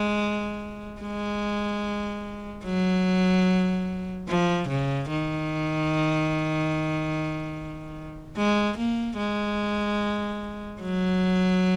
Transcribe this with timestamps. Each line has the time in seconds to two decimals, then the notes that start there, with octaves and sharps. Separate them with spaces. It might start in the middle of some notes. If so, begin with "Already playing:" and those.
Already playing: G#3
1.01 G#3
2.64 F#3
4.28 F3
4.68 C#3
5.10 D#3
8.37 G#3
8.77 A#3
9.17 G#3
10.81 F#3